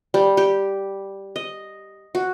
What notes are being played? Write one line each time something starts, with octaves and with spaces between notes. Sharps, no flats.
G3
G4
D#5
F#4